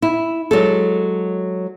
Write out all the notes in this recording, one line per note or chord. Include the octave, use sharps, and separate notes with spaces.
E4
F#3 G#3 A4